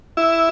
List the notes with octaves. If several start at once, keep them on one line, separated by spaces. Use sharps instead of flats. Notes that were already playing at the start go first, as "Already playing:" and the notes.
E4